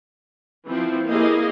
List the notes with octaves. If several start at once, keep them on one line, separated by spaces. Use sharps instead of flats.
E3 F3 C4
A#3 E4 G4 G#4 D#5 F5